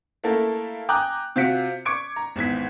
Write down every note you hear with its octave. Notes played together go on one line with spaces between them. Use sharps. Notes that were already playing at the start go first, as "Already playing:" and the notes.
A3 A#3 E4 A4 A#4
G5 G#5 A#5 D6 D#6 F#6
C3 C4 F4 F#4 B6 C#7
C#6 D6 G#6 C#7 D7
A#5
G#1 E2 G#6 B6